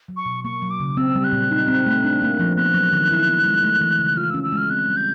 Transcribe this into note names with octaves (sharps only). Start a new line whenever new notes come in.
F#3
C#6
B2
A#3 C#6
F#3
D6
C#3
C4 E6
G3
F#6
A#2
D#4
C4
A3
D4
A#3
F3
B3 F#6
F#3
D#3
E4
B3
G#3
A3
E3
C#3
F4 F6
C#4 E6
E6
G#3
F6
C4 F#6
G3
G6